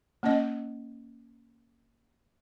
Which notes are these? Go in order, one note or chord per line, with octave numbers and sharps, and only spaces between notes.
A#3 C#4 D#5